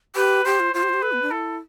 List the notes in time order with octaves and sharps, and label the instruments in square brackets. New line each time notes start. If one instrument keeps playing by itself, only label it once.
[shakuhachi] G4 [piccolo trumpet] B4
[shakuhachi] G4 [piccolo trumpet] C5
[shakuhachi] F4
[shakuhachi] F4 [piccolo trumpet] C5
[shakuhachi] G4
F4
G4
[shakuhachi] A4 [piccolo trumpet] B4
[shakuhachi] B3
D4
[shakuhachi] E4 [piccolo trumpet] A4